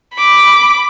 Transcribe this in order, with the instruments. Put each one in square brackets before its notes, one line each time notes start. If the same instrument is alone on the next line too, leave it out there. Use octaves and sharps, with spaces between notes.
[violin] B5 D6